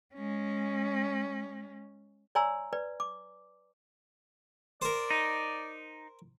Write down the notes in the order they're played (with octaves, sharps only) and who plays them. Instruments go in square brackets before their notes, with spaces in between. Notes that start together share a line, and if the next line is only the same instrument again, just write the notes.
[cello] G#3 C#4
[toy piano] C#5 D5 G#5 A#5 C6 E6
B4 D5
D6
[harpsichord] A#4 C5 [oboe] D5
[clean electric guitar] D#4